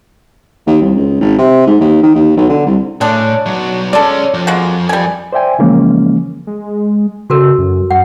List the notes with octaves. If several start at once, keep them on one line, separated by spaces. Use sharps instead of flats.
D#2
C2
C#2
G#1
C3
G#2
D#2
D#3
D#2
B1
D3
C2
A2 G#3 D4
B1 F#3
G#3 C#4 A4 D5
F2
G#3 A#3 F#4
G3 G#5
C5 D5 E5 G5 G#5
C#3 E3 F3 G#3 A#3 C#4
G#3
C#3 F#4 A4 A#4
F#2
F#2 F#5